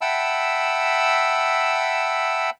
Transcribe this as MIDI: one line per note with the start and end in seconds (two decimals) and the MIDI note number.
0.01 2.50 76
0.01 2.50 78
0.01 2.50 79
0.01 2.50 81
0.01 2.50 83
0.01 2.50 88